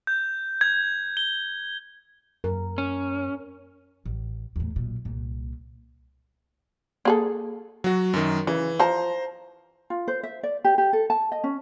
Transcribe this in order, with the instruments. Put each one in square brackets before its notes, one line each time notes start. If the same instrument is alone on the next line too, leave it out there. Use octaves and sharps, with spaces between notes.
[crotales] G6
G#6
G7
[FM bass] F#2 [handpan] A#4
[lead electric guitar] C#4
[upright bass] A1
E2 A2
B1 A#2
C2 A#2
[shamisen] A#3 G#4 A4
[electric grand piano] F#3 F#4
F#2 D#3
[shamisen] C#3 [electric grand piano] E3
[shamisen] F3 A5 [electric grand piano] C5 A#5
[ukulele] F4
C5
E5
D5
G4
G4
A4
A5
D#5
C#4